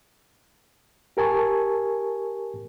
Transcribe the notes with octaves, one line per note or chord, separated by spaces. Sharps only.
G4 A#4 G#5 A5 C#6